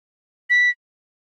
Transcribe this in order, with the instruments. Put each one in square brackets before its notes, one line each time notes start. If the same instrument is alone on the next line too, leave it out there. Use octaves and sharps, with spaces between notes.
[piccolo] B6